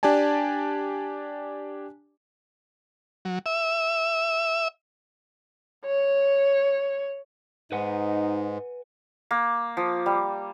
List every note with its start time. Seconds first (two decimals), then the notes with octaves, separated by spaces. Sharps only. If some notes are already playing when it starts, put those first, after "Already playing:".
0.03 D4 G4 D5 G#5 A5
3.25 F#3
3.46 E5
5.85 C#5
7.72 G#2 D#4 B4 F#5 G#5
9.31 A#3
9.77 F3
10.06 G3